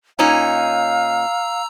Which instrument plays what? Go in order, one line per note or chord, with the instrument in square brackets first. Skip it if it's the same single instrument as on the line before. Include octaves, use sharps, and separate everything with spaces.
[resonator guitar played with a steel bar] A#2 C#4 D#4 [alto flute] F5 [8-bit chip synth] A#5 E6